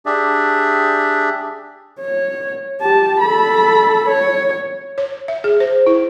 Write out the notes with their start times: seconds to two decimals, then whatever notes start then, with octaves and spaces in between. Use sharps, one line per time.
0.06 D4 G4 G#4 D5 E5
2.00 C#5
2.81 G4 A5
3.21 A4 B5
4.09 C#5
4.98 C#5
5.28 E5
5.44 G#4
5.60 C5
5.86 E4